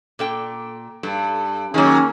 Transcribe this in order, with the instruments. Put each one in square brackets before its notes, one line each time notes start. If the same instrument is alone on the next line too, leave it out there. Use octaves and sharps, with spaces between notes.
[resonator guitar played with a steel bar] A#2 A4 G5
[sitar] G2 [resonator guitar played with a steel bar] A4
[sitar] D#3 F#3 [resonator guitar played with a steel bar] A#3 G#4 [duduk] C#4